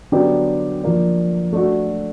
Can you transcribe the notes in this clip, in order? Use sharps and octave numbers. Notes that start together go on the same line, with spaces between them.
D3 F#3 B3 D4 G4
F3 A#3 D4
A3 D4 F#4